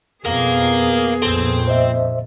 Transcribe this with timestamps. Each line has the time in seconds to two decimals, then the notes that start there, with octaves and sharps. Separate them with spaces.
0.25 F2 B2 B3 G#4 A#4 F5
1.22 A#1 F2 C4 A4
1.68 C5 D#5 E5